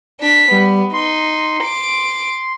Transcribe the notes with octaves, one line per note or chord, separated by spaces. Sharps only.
D4 B6
G3 B3
D#4 C6
D6 D7